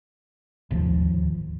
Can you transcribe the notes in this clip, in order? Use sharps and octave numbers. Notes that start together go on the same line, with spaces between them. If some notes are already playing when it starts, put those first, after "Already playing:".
D1 G#1 D#2 F3